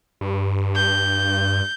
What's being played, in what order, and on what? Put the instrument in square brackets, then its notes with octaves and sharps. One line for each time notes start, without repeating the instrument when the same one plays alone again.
[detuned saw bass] G2
[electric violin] G6